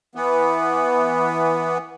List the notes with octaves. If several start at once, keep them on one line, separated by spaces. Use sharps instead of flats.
E3 B3